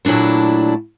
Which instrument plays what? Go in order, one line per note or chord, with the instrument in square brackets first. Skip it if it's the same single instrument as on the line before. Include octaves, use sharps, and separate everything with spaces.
[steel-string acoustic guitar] A#2 F#3 A3 D4 E4